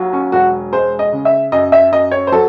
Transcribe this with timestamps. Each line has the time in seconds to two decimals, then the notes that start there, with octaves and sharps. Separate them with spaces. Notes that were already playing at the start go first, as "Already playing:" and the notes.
Already playing: D#2 F#3
0.13 C#4
0.32 E1 F#4
0.73 G#3 C5
0.99 D#5
1.13 C#3
1.25 E5
1.52 F#2 D#5
1.72 E5
1.92 F#2 D#5
2.12 C#5
2.27 C5
2.32 F#3 A4